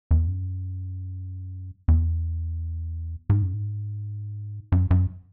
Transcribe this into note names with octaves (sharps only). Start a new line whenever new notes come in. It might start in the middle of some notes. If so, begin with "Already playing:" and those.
E2
F#2
E2
G#2
F#2
G#2
F#2
F#2